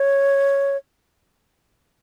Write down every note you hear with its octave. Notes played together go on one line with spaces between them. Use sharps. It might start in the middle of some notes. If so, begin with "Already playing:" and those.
Already playing: C#5